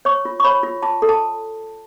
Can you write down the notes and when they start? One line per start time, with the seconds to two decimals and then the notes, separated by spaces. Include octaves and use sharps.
0.05 C#5 C#6
0.25 F4
0.40 C#6
0.44 C#5 B5
0.63 F4
0.83 F4 A5
1.02 A4
1.09 A5